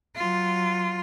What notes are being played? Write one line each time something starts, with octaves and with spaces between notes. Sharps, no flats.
F#3 F4